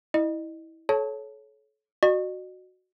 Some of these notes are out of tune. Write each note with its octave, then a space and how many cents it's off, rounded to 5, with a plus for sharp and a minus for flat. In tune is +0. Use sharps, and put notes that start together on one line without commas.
E4 -25 D#5 -30
A4 -35 C#5 +0 A5 +0
F#4 +0 D#5 -45